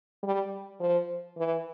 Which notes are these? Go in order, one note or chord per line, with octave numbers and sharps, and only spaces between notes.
G3
F3
E3